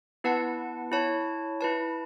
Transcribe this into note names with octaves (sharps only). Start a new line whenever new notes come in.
B3 E4 B4 F#5 A5
E4 C#5 A5
E4 B4 A5